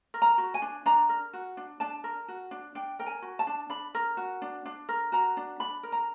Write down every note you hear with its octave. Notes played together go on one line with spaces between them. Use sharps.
A#4
A#5
F#4
G#5
D4
D4 A#5
A#4
F#4
D4
D4 A5
A#4
F#4
D4
D4 G5
A#4 G5
G#5
F#4
A5
D4
D4 B5
A#4
F#4
D4
D4
A#4
F#4 A#5
D4
D4 B5
A#4
A#5